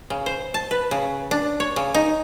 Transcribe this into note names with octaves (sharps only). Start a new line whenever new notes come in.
C#3
C5
A5
B4
C#3
D4
C#5
C#3
D#4